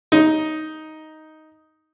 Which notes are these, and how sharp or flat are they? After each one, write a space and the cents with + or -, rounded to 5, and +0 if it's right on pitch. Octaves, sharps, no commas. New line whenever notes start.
D#4 +5